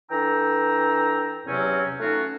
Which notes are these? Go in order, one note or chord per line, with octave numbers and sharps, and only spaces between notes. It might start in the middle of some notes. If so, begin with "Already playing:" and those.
E3 D4 A4 G5 A#5 E6
E2 C3 F#3 C4 C#4
A3 C#4 D#4 F4 F#4